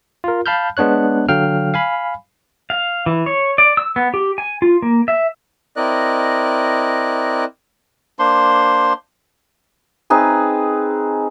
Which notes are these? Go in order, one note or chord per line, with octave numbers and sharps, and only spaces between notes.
F4 A#4
F5 A5 B5 F6 G6
G#3 B3 D4 C#5 F#6
D3 F#3 F5 G5 F6
F5 G#5 B5
F5
E3
C#5
D5
E6
B3
G4
G#5
F4
A#3
E5
C4 E4 A#4 D5 D#5 F#6
A#3 D4 C5 C6
C4 D#4 G#4 B4